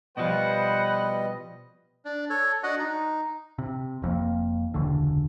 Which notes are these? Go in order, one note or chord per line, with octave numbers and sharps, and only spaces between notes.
B2 F3 G3 B4 C5 D#5 F#5
D4
A4 C#5
D4 F#4 D#5 F#5
D#4
C3
F1 F2 A#2 A#3
E1 C#2 D3